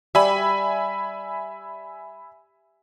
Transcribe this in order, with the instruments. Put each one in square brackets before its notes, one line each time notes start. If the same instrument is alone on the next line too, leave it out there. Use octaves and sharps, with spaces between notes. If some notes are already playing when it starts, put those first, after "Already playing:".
[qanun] G3 [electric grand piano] E5 G#5 B5